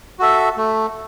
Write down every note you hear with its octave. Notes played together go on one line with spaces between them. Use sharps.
F#4 A4 E5
A3